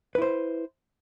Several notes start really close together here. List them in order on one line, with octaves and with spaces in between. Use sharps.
B4 E4 C5